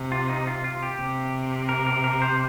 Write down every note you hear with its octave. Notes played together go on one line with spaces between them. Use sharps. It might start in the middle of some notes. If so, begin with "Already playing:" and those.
Already playing: C3
F4
D#4
F4
F4
G4
C3
A#4
A#4
A#4
C5